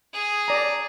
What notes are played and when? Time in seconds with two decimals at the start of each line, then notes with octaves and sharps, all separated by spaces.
0.13 G#4
0.48 D5 A#5